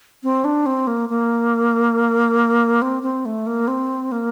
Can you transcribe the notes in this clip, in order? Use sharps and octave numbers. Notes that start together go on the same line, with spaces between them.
C4
D4
C4
A#3
A#3
C4
C4
A3
A#3
C4
A#3